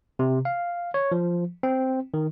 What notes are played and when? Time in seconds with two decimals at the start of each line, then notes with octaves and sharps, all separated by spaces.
0.19 C3
0.45 F5
0.94 C#5
1.12 F3
1.63 C4
2.14 D#3